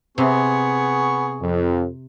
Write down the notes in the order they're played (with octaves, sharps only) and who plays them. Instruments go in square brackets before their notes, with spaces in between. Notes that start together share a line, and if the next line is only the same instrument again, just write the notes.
[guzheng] C3 [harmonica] B3 G#4 C#6
[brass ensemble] F2